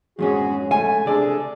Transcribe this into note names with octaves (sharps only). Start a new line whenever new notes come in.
F2 G#2 C#4 F#4 G#4
A3 G#5
C3 D4 G#4 A4 D5